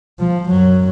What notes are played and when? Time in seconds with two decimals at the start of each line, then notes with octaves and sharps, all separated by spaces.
0.19 F3
0.49 F#2 F#3